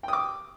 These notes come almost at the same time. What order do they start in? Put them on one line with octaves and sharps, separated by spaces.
G5 D#6 D6